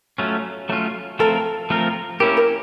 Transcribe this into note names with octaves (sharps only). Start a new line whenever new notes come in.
F#3 A3 C#4 F4
F#3 A3 C#4 F4
F3 A3 C4 F4 A4 A#4
F3 A3 C4 F4 A#4
A#3 C#4 E4 G4 A#4
A#4